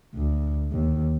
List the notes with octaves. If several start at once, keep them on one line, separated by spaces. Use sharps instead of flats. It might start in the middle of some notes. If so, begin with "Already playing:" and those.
D2
D#2